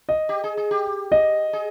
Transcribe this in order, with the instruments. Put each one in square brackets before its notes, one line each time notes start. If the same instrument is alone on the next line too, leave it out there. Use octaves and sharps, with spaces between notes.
[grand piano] D#5
[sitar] G4
G#4
G#4
G4
[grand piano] D#5
[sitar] G#4